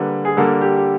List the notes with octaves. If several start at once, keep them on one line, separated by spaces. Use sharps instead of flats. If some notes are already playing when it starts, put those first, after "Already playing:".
Already playing: D3 G3 A#3 B4
G#4
D3 G3 A#3 A4
G4
G4